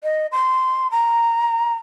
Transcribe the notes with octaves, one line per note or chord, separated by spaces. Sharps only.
D#5
C6
A#5